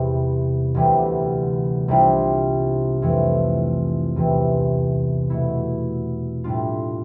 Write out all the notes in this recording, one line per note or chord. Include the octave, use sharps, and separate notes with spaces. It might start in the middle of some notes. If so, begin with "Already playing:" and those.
Already playing: E2 C3 G3
D2 C3 E3 G3 B3
C2 C3 G3 D4 F4
F2 E3 A3
E2 C3 E3
B2 A3 E4
A2 G3 D4 F4